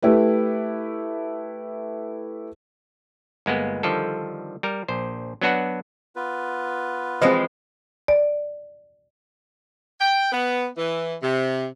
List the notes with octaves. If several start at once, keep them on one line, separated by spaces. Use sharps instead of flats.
A3 E4 G4 B4
G1 G#3 A#3 B3
D3 D#3 F3 G3 A4
G3 A#4
A#1 C5
F#3 B3 D4 F#4 B4 F#5
B3 F4 B4
E3 F3 G#3 C4 D#5
D5
G5
B3
E3
C3